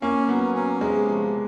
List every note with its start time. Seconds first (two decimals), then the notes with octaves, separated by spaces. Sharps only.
0.02 A#3 C#4
0.28 F#3 B3
0.55 C#4
0.81 C3 G#3
1.07 F3